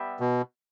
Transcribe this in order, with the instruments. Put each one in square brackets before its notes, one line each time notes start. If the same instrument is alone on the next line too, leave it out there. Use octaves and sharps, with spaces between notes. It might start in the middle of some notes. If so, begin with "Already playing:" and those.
Already playing: [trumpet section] G3 B3 G4 E5
[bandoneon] B2